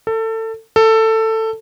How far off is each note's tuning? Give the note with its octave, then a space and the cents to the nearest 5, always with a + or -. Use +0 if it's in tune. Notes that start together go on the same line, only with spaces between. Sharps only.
A4 +25
A4 +15